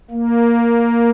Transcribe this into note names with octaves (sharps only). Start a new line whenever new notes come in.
A#3